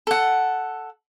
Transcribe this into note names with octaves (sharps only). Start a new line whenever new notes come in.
A4 F#5